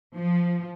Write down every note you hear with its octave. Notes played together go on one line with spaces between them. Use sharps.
F3